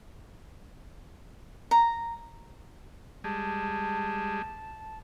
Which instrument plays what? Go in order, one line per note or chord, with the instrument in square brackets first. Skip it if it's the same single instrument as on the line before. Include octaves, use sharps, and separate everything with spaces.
[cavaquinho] A#5
[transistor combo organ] G3 G#3 [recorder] A5